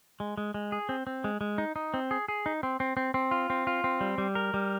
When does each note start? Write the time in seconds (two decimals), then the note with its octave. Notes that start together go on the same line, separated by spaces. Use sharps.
0.20 G#3
0.37 G#3
0.54 G#3
0.72 G#4
0.89 C4
1.07 C4
1.24 G#3
1.41 G#3
1.58 D#4
1.76 D#4
1.94 C4
2.11 G#4
2.28 G#4
2.46 D#4
2.63 C4
2.80 C4
2.97 C4
3.14 C4
3.31 F4
3.50 C4
3.67 F4
3.84 C4
4.01 G3
4.18 G3
4.35 A#4
4.54 G3